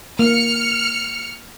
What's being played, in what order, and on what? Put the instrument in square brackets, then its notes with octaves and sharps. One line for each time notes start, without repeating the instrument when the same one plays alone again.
[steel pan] A#3 [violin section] F6 C#7